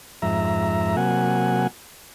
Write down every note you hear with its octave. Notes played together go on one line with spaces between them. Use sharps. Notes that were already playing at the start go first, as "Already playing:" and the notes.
F2 G#2 E5 A#5
C3 F#3 A#3 F#5 G#5